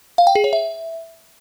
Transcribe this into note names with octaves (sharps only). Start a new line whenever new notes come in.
F5
G5
G#4
C#5
E5